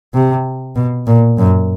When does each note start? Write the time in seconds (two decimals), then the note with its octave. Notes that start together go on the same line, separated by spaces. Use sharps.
0.14 C3
0.76 B2
1.07 A#2
1.38 F#2